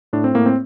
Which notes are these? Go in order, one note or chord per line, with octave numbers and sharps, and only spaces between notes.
A2 D4
C4
A2 A#3
C4